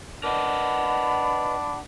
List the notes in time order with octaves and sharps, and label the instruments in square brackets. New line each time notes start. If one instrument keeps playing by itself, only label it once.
[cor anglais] D4 [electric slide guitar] A#4 B4 D#5 [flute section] F#5 B5